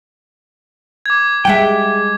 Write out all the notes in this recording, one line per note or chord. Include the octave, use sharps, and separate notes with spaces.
D6 G#6
G3 G#3 E5 F#5 G5